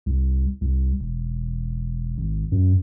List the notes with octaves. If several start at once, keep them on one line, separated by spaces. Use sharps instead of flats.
C2
C2
E1
G#1
F#2